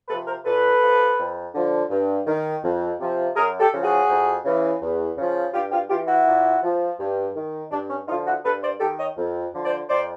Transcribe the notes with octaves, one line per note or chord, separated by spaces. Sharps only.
C3 F3 A4 B4
A#4 C5
A#2 A4 B4
F3
F2
D3 F3
G2
D#3
F2
C3 F3
F#2 G#4 A#4
G4 A4
C#3 F3
F#4 G#4
F2
C#3 E3
E2
C#3 F3
G2 F4 G4
F4 G4
E3 F4 G4
E4 F#4
A#2
F3
G2
D#3
G2 D4
C#4
D3 F3 D#4 F4
E4 F#4
G2 A4 B4
C5 D5
D#3 G4 A4
C#5 D#5
F2
D3 F3
C5 D5
F2 C5 D5